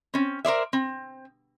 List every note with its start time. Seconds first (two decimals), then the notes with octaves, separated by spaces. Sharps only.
0.14 C4 C#4
0.45 A#4 C5 D5 E5
0.73 C4